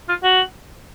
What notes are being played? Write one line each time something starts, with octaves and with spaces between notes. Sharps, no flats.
F4
F#4